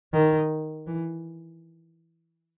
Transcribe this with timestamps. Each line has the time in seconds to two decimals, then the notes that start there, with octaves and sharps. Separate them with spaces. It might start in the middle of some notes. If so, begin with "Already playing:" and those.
0.13 D#3
0.87 E3